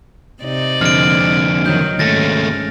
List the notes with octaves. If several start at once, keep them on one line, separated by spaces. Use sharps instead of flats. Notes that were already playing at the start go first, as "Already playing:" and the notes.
C3 D#4 D5
F2 D3 F6 D7
D#3 F#3 D#4 G6
D#2 G#2 A3 C#4 A6 A#6